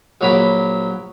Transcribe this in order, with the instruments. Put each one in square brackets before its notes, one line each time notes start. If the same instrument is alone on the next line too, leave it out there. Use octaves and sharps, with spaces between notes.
[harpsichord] A#1 F#3 B5 D6